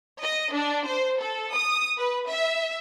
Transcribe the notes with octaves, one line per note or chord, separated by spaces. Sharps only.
D#5
D4
C5
A4
D#6
B4
E5